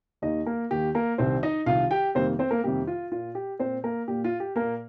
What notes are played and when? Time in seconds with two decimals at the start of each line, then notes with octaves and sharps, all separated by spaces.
0.22 D#2 D#3 A#3 D#4 D#5
0.46 A#3 A#4
0.70 D#2 D#3 A#3 G4
0.95 A#3 A#4
1.18 C2 C3 D#3 C4 C5
1.43 D#4 D#5
1.66 C2 C3 D#3 F4 F5
1.91 G4 G5
2.15 F2 C3 D#3 G3 A#3 C4 C5
2.39 C4 C5
2.51 A#3 A#4
2.63 F2 C3 D#3 G3 A#3 G4
2.87 F4
3.11 A#2 A#3 F4
3.35 G4
3.59 A#2 A#3 C4 C5
3.84 A#3 A#4
4.08 A#2 A#3 G4
4.24 F4
4.40 G4
4.56 A#2 A#3 A#4